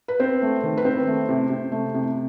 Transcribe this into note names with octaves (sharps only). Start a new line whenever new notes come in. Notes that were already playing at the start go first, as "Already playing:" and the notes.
B4
C4 C5
A3
D#3
B4
C4 C5
A3
C3
C3
A3
C3